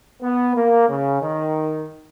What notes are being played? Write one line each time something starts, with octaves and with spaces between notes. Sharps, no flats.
B3
A#3
C#3
D#3